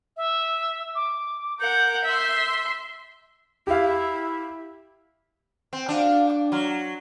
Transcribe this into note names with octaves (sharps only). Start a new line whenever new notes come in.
E5
D6
A#4 F#5 G6
E5 C6
E4 G4 F5
C4 G5
D4 F4 F#4 F5
G5 C#6 D6
F#3 C6 F6